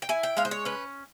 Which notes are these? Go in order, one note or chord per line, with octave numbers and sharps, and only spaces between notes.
G5
E4 G#5
G5
G#3 F5
C5
C#5
C#4 B4